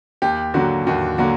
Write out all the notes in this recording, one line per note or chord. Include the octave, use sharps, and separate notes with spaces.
D#2 G4
D3 F#3 A#3 F#4
D#2 F#4
D3 F#3 A#3 F#4